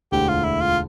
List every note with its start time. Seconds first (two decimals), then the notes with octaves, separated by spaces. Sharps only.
0.12 E1 D2 D3 G4
0.28 F4
0.44 E4
0.61 F4